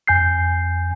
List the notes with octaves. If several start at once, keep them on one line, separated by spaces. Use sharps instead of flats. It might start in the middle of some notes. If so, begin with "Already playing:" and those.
F2 G#5 G6 C7